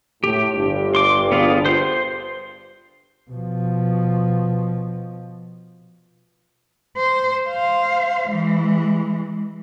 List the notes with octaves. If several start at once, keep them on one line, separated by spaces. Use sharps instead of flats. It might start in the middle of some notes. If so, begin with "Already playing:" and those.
A2 G4
G1 G2
C6 D6
B3 F4 G#4
C5 C6
B2 F3
C5
C5 F5
E3 G#3